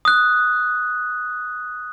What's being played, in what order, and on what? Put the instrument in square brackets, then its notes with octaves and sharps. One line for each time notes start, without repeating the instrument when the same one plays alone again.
[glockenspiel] D#6 F#6